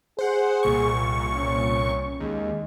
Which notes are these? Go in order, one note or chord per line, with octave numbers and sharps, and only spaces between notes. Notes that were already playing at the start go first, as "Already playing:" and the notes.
G#4 C5 F#5
C2 A#2 C#6
C#4
D#2 G#3